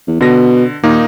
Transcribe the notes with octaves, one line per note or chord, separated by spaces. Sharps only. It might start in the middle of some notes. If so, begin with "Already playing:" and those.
E2
B2 D3 A#6
D#2 A#2 A#3 D#4